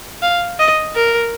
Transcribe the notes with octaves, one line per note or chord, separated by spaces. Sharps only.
F5
D#5
A#4